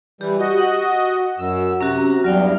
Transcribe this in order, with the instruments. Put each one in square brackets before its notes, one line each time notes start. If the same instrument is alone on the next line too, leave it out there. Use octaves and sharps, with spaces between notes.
[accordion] E3 G3 [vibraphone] G4
[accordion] F#4 D#5
[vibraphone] F#5
[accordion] F#2 E6
[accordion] C3 A#5 [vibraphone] C#4 F#4
[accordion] E2 G2 F6 [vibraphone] F#3 D5 G5